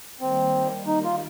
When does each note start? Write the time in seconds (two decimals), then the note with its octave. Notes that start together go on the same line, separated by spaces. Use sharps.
0.21 D#3 G3 A#3 C4
0.87 D#4
1.04 F4